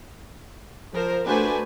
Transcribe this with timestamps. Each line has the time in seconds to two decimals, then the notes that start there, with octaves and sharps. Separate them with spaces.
0.92 F3 A#4 C5
1.25 A3 D4 F#4 B4 C5 G#5